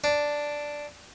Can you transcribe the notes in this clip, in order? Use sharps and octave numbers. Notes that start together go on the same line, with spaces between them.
D4